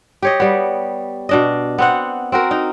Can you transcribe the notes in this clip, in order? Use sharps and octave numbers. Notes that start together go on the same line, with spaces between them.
G4 C#5 D#5
G3 B3
B2 D4 D#5
B3 C4 F#5
C4 F#4 A#4
D#4